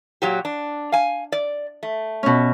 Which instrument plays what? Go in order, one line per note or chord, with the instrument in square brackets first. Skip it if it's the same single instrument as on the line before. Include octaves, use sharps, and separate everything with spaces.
[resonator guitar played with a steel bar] A#2 F#3 G4
D4
F5 G#5
D5
A3
[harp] B2 C#4